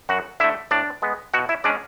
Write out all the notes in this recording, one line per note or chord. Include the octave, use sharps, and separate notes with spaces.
F#2 F#4 F#5
D3 A3 E4 E5
A2 D4 D5
G#3 B3
B2 F#4 F#5
E4 E5
G#3 C#4 D4 D5